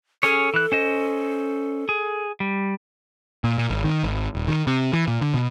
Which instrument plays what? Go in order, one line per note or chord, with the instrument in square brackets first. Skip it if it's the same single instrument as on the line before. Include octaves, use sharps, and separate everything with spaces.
[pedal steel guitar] C#4 G#4 C#5 [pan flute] A4
[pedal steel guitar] E3 F#6
C#4 C5 D#5
G#4
G3
[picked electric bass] A#2
A#2
G#1
D#3
G#1
D#1
D#3
C3
E3
A#2
D3
B2